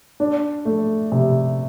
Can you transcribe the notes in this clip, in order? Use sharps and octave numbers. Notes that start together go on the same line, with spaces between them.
D4
A3
C3